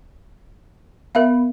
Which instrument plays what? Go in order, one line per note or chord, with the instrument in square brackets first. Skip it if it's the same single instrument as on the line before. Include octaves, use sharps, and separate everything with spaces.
[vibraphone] B3 [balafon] A#4 E5 F5